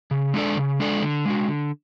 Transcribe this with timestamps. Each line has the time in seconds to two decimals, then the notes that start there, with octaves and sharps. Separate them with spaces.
0.11 C#3
0.34 G#3 D4 A4 D5
0.57 C#3
0.80 G#3 D4 A4 D5
1.02 D3
1.25 G#3 D4 F#4
1.48 D3